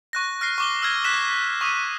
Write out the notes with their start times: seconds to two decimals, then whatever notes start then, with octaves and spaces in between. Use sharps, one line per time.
0.13 C#6 F#6 A#6
0.41 F6 A#6 C7
0.58 C#6 D6 G7
0.82 E6 F6 G#6 A#6
1.04 F#6 B6 E7
1.61 C#6 D#6 D#7